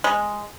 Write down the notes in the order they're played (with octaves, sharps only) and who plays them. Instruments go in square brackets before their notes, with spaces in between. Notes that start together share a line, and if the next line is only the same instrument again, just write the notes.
[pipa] G#3